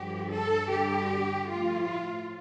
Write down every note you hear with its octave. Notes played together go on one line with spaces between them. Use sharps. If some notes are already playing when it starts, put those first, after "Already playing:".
Already playing: G2 D3 F3 G4
A4
G2 D3 G3 G4
A2 F3 F4